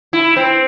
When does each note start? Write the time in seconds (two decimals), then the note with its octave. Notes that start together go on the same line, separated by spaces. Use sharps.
0.13 E4
0.36 C4